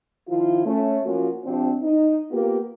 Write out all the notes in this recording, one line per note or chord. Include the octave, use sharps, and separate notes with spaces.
D#3 F3 E4 F4
A3 C#4
F3 A#3 C#4 F4 F#4
C3 F3 C4 D4
D#4
A#3 B3 F4 G4 A#4